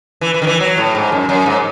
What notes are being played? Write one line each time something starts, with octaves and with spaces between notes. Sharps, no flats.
E3
E3
D#3
E3
F#3
A2
G#2
F#2
F#2
G#2